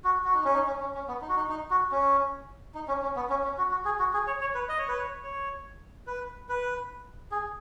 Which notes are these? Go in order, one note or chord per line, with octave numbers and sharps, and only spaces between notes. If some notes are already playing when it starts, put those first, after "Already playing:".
F#4
F#4
D#4
C#4
D#4
C#4
C#4
C#4
B3
D#4
F#4
D#4
D#4
F#4
C#4
D#4
C#4
C#4
B3
C#4
C#4
F#4
F#4
G#4
F#4
G#4
C#5
C#5
B4
D#5
C#5
B4
C#5
C#5
B4
B4
G#4